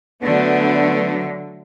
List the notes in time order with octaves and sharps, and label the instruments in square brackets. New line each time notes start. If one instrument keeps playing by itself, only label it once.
[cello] D3 [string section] F#3 A3 D4 [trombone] B3